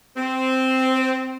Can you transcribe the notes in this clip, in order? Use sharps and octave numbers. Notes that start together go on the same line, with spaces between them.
C4